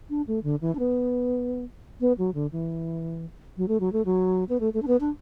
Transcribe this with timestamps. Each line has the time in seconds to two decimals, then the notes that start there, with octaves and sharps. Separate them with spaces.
0.10 D4
0.27 A3
0.43 D3
0.61 E3
0.75 D4
0.79 B3
2.00 B3
2.18 F#3
2.34 D3
2.52 E3
3.57 F#3
3.68 A3
3.80 F#3
3.93 A3
4.05 F#3
4.49 B3
4.60 A3
4.74 A3
4.82 D4
4.87 B3
5.00 D4